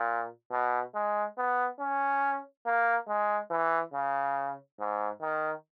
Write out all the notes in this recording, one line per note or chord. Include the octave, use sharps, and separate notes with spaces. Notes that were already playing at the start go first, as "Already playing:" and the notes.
Already playing: A#2
B2
G#3
B3
C#4
A#3
G#3
E3
C#3
G#2
D#3